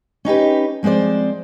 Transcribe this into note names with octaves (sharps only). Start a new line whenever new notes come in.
C#4 D#4 G4 B4
F3 G#3 C4 C5 D5